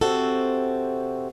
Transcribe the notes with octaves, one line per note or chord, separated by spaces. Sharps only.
C3 C4 F#4 A4